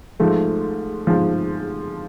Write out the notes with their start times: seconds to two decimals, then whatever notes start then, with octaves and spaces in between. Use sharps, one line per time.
0.20 G#2 F3 A3
1.07 G#2 F3